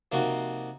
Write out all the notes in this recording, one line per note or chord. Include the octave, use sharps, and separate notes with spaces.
C3 F3 A#3 D#4 F#4